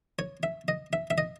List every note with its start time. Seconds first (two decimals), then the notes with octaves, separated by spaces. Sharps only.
0.19 C#5
0.43 E5
0.68 D#5
0.93 E5
1.10 E5
1.18 D#5